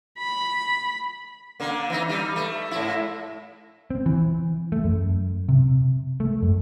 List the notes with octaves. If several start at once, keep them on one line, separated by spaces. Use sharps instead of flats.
B5
D3 A#3
E3 D#4
G3 D#4
A3
G#2 E4
C4
E3
A3
F#2
C3
A3
F#2